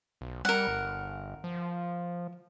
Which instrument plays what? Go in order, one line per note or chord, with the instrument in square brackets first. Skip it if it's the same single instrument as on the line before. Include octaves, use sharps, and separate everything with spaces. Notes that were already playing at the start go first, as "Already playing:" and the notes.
[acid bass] B1
[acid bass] G3 [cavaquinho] A#4 F#5
[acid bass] G1
F3